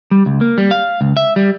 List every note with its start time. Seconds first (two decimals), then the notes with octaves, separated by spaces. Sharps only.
0.11 G3
0.26 C#2
0.41 A#3
0.58 G3
0.71 F5
1.01 C#2
1.17 E5
1.36 G3